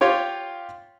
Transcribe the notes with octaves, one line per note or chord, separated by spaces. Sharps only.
F4 G4 C#5 G5